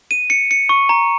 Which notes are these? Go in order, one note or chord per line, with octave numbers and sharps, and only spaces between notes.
D#7
C#7
C#7
C#6
A#5